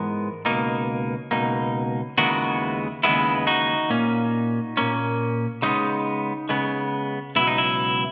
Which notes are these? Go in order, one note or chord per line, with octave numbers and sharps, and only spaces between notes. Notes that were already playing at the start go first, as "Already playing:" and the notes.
Already playing: G#2 E3 G#3 B3 A#4
C#2 B2 A#3 D#4
C#2 B2 A#3 D#4
D#2 C#3 E3 G#3 B3 F#4 A#4
D#2 C#3 E3 G#3 B3 E4
D#4 F#4
A#2 A#3 C#4
A#2 A#3 C#4
C#3 G#3 B3 D#4
C#3 G#3 B3
C#2 B2 F#3 E4
D#4
E4